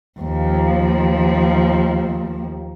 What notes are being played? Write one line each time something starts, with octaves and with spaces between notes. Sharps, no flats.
D#2 F3